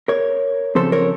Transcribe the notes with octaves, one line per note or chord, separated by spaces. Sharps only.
A#4 C#5
C#3 F3 C4 A4 C5
A#4 C#5